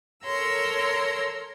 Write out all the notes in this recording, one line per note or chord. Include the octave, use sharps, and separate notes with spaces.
A4 A#4 C#5 A#5 C6 E6